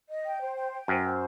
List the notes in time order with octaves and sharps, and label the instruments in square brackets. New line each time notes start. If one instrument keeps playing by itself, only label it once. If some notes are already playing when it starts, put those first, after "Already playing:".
[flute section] D#5
G5
C5
G5
G5
[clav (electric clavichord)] F#2 [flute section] C5
[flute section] C5